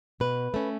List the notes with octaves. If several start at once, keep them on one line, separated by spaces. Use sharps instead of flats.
B2 B4
A3 C#4